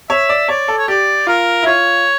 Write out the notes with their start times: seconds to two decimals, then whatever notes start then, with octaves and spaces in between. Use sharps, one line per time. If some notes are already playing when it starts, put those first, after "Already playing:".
0.10 C#5 E5
0.29 D5
0.48 C#5 D5
0.68 A4
0.78 C#5
0.88 G4 D5
1.27 F4 A#4
1.63 E4
1.66 F4 C#5